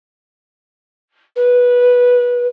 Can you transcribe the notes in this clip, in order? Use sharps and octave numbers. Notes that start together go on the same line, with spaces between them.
B4